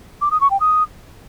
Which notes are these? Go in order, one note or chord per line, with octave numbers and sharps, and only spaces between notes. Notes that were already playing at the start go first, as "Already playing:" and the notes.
D6
D#6
C#6
G5
D#6